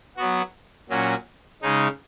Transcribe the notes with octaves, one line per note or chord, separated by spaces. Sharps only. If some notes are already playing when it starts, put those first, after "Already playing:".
F#3 B3 F#4
A#2 F#3 C#4 F#4
C#3 G#3 D#4